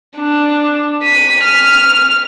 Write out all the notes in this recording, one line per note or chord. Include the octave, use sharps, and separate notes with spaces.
D4
B6 D#7
F6